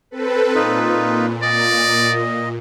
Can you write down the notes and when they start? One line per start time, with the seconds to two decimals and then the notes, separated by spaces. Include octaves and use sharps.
0.11 C4 A4 B4
0.55 A#2 D#4 F4 B4
1.43 A#2 D5 D#5